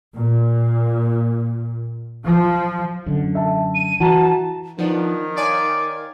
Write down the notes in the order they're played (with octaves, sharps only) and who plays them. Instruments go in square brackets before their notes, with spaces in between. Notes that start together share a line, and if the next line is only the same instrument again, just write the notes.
[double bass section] A#2
F3
[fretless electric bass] F#2 D3
[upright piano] E5 A5
[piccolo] D#7
[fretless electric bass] E3 [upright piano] F#4 A#5 [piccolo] A5
[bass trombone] D#3 [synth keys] F3 B3 D4 [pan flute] D#4
[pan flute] C#5 [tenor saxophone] D5 [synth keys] F5 G#5